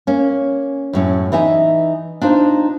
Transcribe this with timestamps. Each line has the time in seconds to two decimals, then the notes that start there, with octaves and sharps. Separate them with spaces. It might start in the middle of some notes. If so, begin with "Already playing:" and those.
0.07 A#3 C#4
0.93 F#2 A2 C#4
1.32 E3 D#4 E5 G#5
2.22 D4 D#4 F4 C5